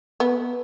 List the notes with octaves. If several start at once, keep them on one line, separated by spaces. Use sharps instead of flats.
B3